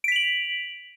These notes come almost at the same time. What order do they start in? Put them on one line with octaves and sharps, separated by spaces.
D7 B6 F7 F#7